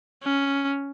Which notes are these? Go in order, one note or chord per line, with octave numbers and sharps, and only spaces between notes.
C#4